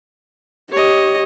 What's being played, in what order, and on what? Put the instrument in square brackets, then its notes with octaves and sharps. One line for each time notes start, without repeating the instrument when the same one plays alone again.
[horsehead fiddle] G4 [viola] C#5 D#5